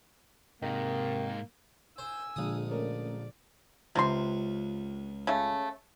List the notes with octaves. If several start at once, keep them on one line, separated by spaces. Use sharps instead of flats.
G#2 C3 D#3 A#3 D#4
C5 G#5 E6
A#1 D3 F3 G#3 D#6
A3 C#4 A#4 D5
C#2 C3 F4 C6
C#3 A3